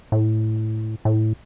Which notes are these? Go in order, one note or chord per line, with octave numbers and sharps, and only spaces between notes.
A2
A2